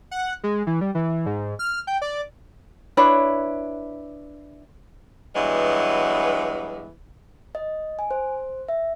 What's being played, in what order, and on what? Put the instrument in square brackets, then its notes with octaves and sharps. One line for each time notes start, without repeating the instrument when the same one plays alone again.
[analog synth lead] F#5
G#3
E3
G3
E3
G#2
F6
G5
D5
[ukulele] D4 E4 B4 C#5
[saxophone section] G2 E3 F#3 G#3 B3
[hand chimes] D#5
G#5
C5
E5